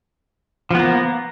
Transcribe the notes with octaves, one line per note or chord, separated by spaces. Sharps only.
F3 A#3 B3